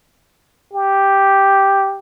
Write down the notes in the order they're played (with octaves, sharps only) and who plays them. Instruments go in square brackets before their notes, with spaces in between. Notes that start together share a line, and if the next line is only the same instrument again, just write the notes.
[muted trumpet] G4